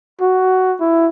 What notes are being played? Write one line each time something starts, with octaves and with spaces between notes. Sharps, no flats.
F#4
E4